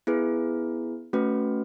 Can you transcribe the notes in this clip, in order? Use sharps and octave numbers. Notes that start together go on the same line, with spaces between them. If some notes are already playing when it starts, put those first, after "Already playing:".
B3 E4 G#4 B4
A3 C#4 F#4 B4